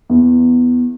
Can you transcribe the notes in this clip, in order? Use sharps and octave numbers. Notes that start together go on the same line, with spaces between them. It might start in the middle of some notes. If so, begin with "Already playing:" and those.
E2